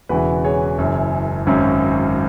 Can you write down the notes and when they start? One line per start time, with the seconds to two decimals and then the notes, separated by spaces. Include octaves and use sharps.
0.09 E1 E2 C#3 E3 F#4 B4
0.44 G#4 C#5
0.78 F#1 F#2 E3
1.47 G#1 F#2 F#3 C#4